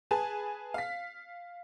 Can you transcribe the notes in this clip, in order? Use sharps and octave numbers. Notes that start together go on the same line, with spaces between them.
G#4 B4 G#5 A5
F5 B6